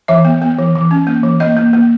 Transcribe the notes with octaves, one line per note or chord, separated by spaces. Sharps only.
E3 E5
B3
B3
E3
E3
C#4
A#3
E3
A#3 D#5
A#3
A#3